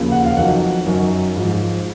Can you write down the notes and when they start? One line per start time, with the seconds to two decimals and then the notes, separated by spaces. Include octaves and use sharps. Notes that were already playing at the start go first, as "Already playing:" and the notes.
Already playing: D#2 C#3 F3
0.12 F#5
0.25 F5
0.37 F2 D#3 F#3 F#5
0.86 F#2 D#3 F#3
1.36 G#2 F3